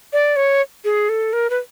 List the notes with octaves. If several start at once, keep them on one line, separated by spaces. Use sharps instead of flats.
D5
C#5
G#4
A4
A#4
B4